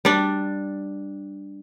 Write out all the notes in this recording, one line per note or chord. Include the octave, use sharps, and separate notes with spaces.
G3 D4